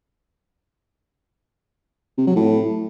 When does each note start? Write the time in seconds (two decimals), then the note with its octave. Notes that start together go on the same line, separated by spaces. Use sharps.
2.18 C3
2.27 F#3
2.36 A2